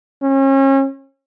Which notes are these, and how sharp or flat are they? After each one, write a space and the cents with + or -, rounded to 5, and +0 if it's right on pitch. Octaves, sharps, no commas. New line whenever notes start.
C#4 -35